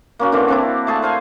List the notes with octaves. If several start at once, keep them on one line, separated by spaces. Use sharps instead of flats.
A#3 C#4 F#4
D3 E3 A#3 C4
C4 D4 E4
A3 G#4 A5
C5 F5 G#5